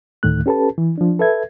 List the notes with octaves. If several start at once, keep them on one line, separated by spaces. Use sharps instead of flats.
D2 A2 D#3 A3 F#6
C#4 G4 A4 B4 A5
E3
F3 D4
A4 B4 E5 G#6